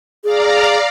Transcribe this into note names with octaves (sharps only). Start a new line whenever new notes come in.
G#4 D5 F5 A#5